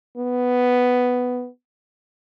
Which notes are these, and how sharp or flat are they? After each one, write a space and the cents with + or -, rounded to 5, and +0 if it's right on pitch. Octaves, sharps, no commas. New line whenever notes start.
B3 +5